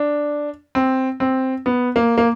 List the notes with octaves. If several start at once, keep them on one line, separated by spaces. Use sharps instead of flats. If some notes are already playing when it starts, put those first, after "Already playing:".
Already playing: D4
C4
C4
B3
A#3
A#3